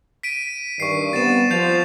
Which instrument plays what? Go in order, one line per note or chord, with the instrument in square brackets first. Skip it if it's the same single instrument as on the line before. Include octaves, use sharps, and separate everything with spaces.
[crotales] B6 D7 D#7
[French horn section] G2 D#3 [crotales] C#6 C7
[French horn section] G2 B3 C4 [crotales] A6 E7
[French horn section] F3 [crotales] G6 C7 F7